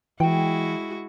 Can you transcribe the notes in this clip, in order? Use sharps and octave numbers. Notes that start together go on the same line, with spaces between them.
E3 G#3 E4 F#4 G5